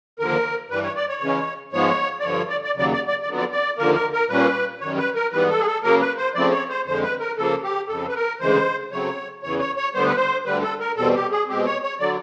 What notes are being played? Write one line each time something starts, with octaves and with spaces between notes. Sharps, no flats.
D#2 D3 F3 A#3 A#4
G2 E3 G3 B4
C#5
D5
C#5
C#3 E3 G#3 C#4
G#2 F3 G#3 B3 C#5
D5
G2 D3 F3 C#5
D5
D5
D#2 C#3 F#3 D5
D5
D5
D5
F2 D3 F#3 B3
D5
D5
D#2 D3 F3 A#3 A#4
A#4
A#4
A#2 G3 A#3 C#4 B4
F#2 D#3 G3 C#5
B4
A#4
G#2 E3 G3 B3 B4
A4
G#4
A4
C#3 F#3 A#3 A#4
B4
C5
C#3 F3 A3 C4 D5
C#5
C5
F2 D3 F3 G#3 C5
B4
A#4
C#3 F3 A#3 A4
G4
F2 C#3 F3 A4
B4
A#4
D2 C#3 E3 G#3 C5
C#3 F#3 A3 C4 C#5
E2 C#3 E3 C#5
C#5
C#5
D2 D3 G3 B3 C5
B4
C5
D2 D3 G3 B4
A4
A#4
E2 B2 G3 C4 A4
G4
G#4
B2 G#3 C4 G4
C#5
C#5
D3 F#3 D5